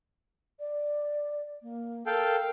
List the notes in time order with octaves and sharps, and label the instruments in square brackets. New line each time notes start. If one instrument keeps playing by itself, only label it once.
[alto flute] D5
A#3
[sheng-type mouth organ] A4 F5 G5 [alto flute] A#4